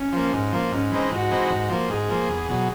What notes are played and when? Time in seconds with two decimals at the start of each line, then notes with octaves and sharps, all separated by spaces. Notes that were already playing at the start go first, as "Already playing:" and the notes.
Already playing: C#4
0.13 F3 A#3
0.33 G#2
0.52 F3 A#3
0.72 G#2 C#4
0.91 E3 G#3 C4 D#4
1.11 G#2 F#4
1.31 E3 G#3 C4 D#4
1.50 G#2
1.70 F3 A#3
1.89 G#2 G#4
2.09 F3 A#3
2.29 E2
2.49 B2 F#3